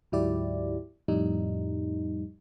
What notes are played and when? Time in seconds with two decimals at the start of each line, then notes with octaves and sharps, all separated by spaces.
0.12 D2 G#2 F#3 E4 G4 D5
1.08 F2 A2 G3 D#4